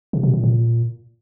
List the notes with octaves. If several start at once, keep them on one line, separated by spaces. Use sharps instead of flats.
C3
B2
A#2
A#2